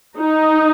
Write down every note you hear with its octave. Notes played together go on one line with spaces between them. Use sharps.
D#4